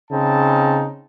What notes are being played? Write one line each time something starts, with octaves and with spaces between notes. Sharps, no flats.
C#3 C4 D#4 A5